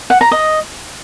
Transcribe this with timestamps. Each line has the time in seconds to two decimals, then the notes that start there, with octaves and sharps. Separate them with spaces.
0.10 F#5
0.21 A#5
0.31 D#5